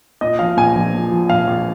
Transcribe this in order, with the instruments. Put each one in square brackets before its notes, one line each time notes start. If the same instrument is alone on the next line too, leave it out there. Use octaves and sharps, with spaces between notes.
[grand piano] A#2 D#5
F3 F5
A#1 G#5
A#1
A#2
F3
A#1 F5
A#1